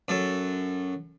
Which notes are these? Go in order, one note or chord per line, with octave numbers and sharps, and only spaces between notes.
F#2 A4